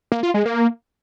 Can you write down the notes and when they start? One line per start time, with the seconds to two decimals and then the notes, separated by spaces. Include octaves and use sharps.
0.12 A#3
0.23 F4
0.34 G#3
0.46 A#3